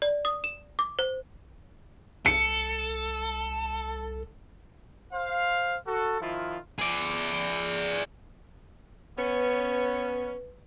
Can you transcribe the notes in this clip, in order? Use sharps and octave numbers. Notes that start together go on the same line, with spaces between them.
D5
D#6
E7
D6
C5
C2 A4 C#7
C5 F5
F#4 A4
D#3 F3 E4 F4
G#4 D5
B3 C#4 B4